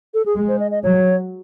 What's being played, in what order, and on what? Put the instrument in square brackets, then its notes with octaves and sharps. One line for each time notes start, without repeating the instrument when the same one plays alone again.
[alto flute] A4
G#4
[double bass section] G#3
[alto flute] C5
D#5
D#5
[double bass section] F#3 [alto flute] C#5